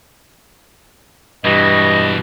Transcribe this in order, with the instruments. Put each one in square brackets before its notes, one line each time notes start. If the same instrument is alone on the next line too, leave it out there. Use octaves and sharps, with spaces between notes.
[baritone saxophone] G2 [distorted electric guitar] B2 E3 [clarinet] D#5